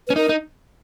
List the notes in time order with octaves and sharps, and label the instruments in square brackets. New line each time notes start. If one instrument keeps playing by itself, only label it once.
[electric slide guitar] C#4 [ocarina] B4
[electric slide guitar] D#4 [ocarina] A#4
[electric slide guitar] D#4